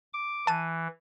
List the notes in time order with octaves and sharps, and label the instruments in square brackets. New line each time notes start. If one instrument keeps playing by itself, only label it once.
[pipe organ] D6
[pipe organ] E3 [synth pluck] A5 D#7